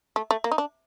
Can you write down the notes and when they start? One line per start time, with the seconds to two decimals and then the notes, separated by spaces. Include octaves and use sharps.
0.16 A3
0.31 A3
0.44 A#3
0.52 D#4
0.58 D4